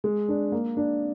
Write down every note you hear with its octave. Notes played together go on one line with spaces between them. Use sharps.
G#3
D4
A#3
D4